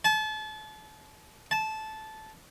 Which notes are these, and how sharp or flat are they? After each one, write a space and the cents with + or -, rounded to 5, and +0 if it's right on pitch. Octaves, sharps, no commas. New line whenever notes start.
A5 -35
A5 -15